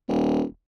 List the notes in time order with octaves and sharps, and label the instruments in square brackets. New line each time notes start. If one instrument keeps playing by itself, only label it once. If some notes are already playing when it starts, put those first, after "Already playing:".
[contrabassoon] D#1